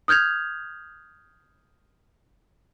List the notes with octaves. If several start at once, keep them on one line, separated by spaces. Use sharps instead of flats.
D#6 F6 G6 G#6 F7